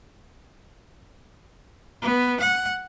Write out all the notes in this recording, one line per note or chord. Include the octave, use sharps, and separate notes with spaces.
B3
F#5